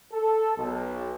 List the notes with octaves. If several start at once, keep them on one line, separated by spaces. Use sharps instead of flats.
A4
B1